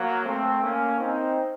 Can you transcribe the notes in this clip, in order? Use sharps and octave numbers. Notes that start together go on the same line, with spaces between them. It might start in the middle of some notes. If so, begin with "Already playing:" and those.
Already playing: F#3 A#3
A3 C4
A#3 C#4
C4 D#4